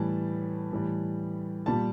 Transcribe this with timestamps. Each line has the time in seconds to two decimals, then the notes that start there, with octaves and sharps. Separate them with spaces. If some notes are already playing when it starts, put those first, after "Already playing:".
Already playing: A2 E3 G3 A5
0.72 A2 E3 G3
1.66 A#2 G3 A5